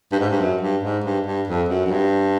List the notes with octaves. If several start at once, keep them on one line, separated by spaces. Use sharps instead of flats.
G2
G#2
G2
F#2
G2
G#2
G2
G2
F2
F#2
F#2
G2